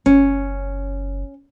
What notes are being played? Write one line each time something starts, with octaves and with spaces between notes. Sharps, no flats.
F#1 C#4